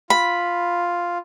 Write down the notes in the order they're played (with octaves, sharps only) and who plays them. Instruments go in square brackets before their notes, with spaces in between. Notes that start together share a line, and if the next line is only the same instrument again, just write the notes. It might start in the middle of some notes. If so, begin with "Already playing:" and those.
[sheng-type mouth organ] F4 [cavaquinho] B5